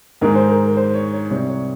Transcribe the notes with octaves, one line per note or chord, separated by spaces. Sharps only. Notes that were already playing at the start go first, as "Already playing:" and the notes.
G#2 D#3 G#3 A#4
C5
A#4
A#4
C5
C#5
C#5
C2 C3 G3 C#5
C#5